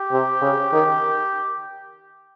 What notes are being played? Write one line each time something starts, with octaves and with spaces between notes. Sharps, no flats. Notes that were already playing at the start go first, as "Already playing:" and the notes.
Already playing: G4
C3
C#3
D#3